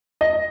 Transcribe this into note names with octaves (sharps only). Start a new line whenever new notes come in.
D#5